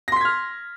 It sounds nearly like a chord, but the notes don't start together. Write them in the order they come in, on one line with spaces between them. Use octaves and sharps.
A#6 C6 B6 G#6 F6